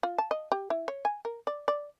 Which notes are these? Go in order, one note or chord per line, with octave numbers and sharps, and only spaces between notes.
F4
A5
D#5
G4
E4
C#5
G#5
A#4
D5
D5